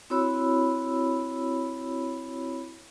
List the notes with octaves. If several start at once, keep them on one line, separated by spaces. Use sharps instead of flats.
C4 E4 F#4 C#5 B5 E6